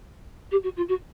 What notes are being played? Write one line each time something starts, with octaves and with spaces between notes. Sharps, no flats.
G4
F#4
F4
F#4